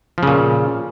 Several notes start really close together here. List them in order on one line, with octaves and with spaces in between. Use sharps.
F3 C#3 A#2